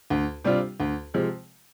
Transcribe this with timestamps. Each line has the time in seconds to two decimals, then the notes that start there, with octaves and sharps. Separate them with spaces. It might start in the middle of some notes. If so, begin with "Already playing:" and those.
0.10 D2
0.45 C3 G3 D4 F4
0.80 D2
1.14 C3 F3 G#3